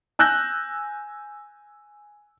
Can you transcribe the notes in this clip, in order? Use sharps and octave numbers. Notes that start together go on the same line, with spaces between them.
G#5 E6 F#6 G6 A#6